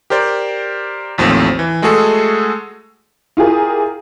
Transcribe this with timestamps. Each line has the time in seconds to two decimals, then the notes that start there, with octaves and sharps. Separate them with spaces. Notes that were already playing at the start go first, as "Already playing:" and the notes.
0.10 G4 A#4 C5 D5
1.18 A1 D#2 F3 A3 C4
1.59 E3
1.82 G#3 A3 F#4 G#4 A4
3.37 E4 F4 G4 G#4 A#4